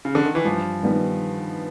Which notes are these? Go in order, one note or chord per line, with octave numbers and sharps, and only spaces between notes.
C#3
D3
D#3
E3
G2 F3
D#3 G3 B3